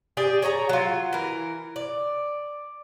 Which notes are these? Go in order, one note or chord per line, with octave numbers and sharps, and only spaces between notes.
G4 G#4 D5
G#4 C#5 A5 A#5
F#3 F4
E3 A#4
D5